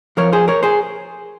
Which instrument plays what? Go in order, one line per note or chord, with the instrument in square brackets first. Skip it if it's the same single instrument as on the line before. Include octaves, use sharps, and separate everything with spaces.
[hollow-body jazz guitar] F2 C#3 F3 A#4 C#5
G#4 C5
A#4 C#5
G#4 C5